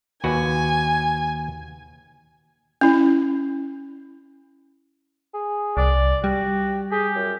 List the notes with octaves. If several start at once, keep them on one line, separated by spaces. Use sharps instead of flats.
D#2 F#4 B4 G#5
C#4 E4
G#4
C2 D5
G3 F#4 G4
G4 G#4
F#2